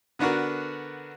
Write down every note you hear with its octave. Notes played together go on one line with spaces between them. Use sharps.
D3 B3 D4 F#4 A#4